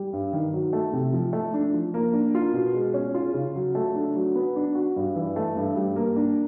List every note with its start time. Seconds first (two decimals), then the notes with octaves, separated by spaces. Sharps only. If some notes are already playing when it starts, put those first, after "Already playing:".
Already playing: G3
0.13 G2
0.33 D#3
0.53 F#3
0.73 A3
0.93 C3
1.13 F3
1.33 A3
1.54 D4
1.73 F3
1.94 A#3
2.13 D4
2.35 F4
2.54 B2
2.74 G#3
2.94 C#4
3.14 F4
3.34 C#3
3.55 F#3
3.75 A3
3.95 D4
4.15 F#3
4.35 B3
4.56 D4
4.75 F#4
4.96 G2
5.16 E3
5.36 A3
5.56 G2
5.76 G3
5.96 A#3
6.17 D4